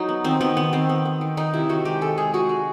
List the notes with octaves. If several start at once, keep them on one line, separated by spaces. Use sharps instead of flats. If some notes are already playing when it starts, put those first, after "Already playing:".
Already playing: F#3 D#4
B3
D#3 C4
D#3 B3
D#3 B3
D#3 C4
B3
B3
D#3
D#3 D#4
C3 E4
D#3 F#4
G#3 G4
G#3 A4
G#3 G#4
G#3 F#4
G#3